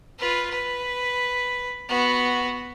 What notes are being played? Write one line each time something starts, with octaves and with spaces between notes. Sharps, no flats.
F4 B4
B4
B3 F#4